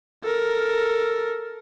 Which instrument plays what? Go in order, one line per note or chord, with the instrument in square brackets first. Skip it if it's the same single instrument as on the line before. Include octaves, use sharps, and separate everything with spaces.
[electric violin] A4 A#4